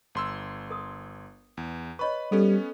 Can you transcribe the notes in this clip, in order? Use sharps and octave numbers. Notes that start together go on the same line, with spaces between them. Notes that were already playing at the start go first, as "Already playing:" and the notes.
G1 C6 E6
A#4 D#6
E2
B4 C#5 D#5 B5 C#6
G3 B3 C#4 A4